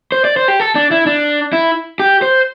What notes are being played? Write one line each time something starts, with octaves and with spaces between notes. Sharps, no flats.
C5
D5
C5
G4
A4
D4
E4
D4
E4
G4
C5